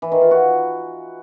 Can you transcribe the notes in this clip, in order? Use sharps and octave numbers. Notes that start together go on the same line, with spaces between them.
E3
D#3
F4
F#4